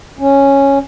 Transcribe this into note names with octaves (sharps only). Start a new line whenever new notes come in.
C#4